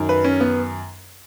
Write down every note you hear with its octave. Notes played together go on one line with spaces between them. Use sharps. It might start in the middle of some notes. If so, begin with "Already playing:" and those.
Already playing: F#2 D#3
B4
C#4
B3